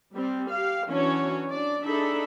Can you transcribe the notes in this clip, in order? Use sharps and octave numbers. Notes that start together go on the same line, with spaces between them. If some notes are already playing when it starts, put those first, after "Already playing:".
G3 C4
G4 F5
E3 F#3 C#4 D4 F#4 C#5
D4 D5
D4 D#4 G#4 A4 E5 B5